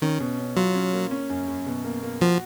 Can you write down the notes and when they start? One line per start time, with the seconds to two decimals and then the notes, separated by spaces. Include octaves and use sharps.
0.02 D#3 C#4
0.20 B2
0.39 C#4
0.56 F#3 F4
0.75 C#4
0.93 A#3
1.11 C#4
1.30 F#2
1.48 F#2
1.66 B2
1.84 A#3
2.03 A#3
2.21 F3 F#4